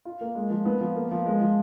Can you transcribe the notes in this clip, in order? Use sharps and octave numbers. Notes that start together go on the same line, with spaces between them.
F4
A#3
G#3
F3
B3
F3
A#3
F3
G#3
F3